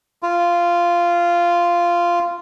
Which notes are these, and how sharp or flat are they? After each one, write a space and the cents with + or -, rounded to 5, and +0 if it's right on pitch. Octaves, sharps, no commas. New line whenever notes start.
F4 -10